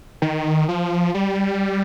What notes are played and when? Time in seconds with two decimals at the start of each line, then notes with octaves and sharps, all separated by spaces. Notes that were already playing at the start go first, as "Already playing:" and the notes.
0.22 D#3
0.68 F3
1.14 G3